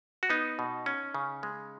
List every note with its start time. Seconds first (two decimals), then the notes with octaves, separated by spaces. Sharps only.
0.23 F#4
0.30 B3 D#4
0.59 B2
0.86 C#4
1.14 C#3
1.43 G#3